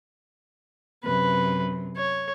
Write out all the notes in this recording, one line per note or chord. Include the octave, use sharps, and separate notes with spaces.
F#2 C3 B4
C#5